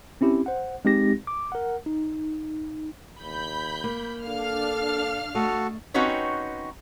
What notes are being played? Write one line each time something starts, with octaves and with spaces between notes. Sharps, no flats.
C4 C#4 E4 G4
C5 F#5
G#3 C4 D#4 G4 A#6
D6
A#4 F#5
D#4
D#2 B5 G6
A#3
D4 A4 F5 F6
A3 F#4 A4 D#5
C4 C#4 D#4 F#4 B4 C#5